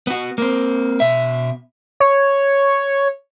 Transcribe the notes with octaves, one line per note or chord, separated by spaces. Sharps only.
B3 F#4
A#3 C4
B2 E5
C#5